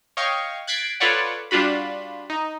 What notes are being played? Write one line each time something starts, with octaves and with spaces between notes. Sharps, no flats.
C#5 D#5 F5 G5 C#6
F#6 G#6 A6 B6 C7 D7
F4 A4 B4 C#5 D5 F#5
G3 D4 F4 F#4 B5
D#4